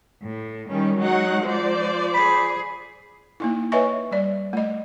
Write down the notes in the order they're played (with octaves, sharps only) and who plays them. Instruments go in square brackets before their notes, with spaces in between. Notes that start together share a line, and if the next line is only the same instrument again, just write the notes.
[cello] A2
[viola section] D#3 C#4 [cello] G3
[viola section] F#3 D#4 F#5 [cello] G#3
[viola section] F3 C5 D5
[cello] G#4 [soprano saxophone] B5
[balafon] A#3 D#4 E4
B4 C#5 D#5 E5 G#5 C#6
G3 D5
A3 D#5